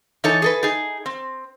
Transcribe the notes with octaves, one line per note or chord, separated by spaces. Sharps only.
E3 D#4 A4 C#5 A5
G#4 A4 B4
D#4 G#4
C4